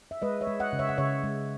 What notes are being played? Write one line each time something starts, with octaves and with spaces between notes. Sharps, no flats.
E5
G#3 B4 D#5
C#5 E5
G#3
D#5 F#5
C#3
C#5 E5
F#5
C#3 C#5 E5
G#3